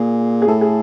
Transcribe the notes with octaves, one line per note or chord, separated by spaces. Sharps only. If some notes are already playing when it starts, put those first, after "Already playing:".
Already playing: A#2 G#4
G#4
A2 A4
G#4